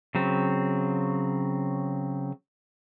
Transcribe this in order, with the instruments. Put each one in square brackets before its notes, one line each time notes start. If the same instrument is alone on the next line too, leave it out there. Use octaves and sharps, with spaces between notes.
[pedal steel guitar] C#3 F#3 C4